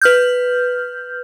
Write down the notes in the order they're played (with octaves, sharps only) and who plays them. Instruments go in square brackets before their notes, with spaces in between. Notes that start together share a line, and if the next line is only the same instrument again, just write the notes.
[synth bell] B4 F6 G6